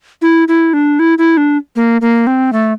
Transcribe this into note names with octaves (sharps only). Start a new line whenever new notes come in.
E4
E4
D4
E4
E4
D4
A#3
A#3
C4
A3